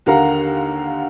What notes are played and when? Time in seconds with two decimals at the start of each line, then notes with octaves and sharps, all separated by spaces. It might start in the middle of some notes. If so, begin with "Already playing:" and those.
0.06 D#2 D3 A#4 F5 F#5 A#5